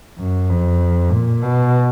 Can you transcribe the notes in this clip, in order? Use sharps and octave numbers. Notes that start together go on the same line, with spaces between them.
F#2
F2
A#2
B2